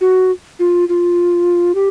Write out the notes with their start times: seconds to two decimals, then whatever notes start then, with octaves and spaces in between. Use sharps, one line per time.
0.01 F#4
0.59 F4
0.89 F4
1.75 G4